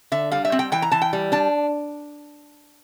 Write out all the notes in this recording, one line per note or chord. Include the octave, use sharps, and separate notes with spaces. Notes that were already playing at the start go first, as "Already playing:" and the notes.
D3 E5
G3 F5
E5
C4
G5
E3 G5
A#5
E3 A5
G5
G3
D4 A5